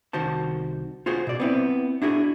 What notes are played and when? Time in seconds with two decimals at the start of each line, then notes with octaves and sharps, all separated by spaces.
0.13 C2 D#3 F#4 C5 A5
1.06 F4 F#4 G#4 C5
1.27 B2 D5
1.40 B3 C4 E4
2.02 D4 E4 F#4 G#4